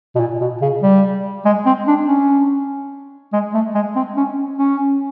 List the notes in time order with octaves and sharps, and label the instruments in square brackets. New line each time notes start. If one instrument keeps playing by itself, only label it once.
[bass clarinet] B2
A#2
B2
C#3
G3
G#3
C4
D4
C#4
G#3
A3
G#3
C4
C#4
C#4